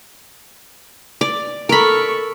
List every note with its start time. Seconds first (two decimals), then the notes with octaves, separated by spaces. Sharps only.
1.21 D5
1.69 A4 A#4 B5 C#6